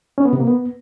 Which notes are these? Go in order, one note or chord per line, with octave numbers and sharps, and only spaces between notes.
C#4
B3
C3
A#3
B3